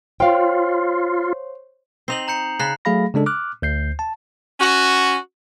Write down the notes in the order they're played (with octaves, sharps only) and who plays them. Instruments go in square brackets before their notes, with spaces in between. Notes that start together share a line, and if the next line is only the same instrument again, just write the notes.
[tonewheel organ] F4 [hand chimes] C5 C#5 C6 [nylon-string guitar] F5 G5
[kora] C4 D#4 D#5 [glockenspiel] C7 F7 F#7
[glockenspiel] A#5 G6 C#7
[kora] C#3 [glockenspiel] A#5 F#6 C7
[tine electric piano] F#3 A3 G#4 F5 B5 A#6
C#3 G#3 D4 A4
D6 F6 F#6
D2 G6 C7
A5
[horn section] C#4 F#4